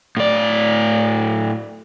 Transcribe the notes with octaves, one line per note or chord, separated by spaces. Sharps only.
A2 D5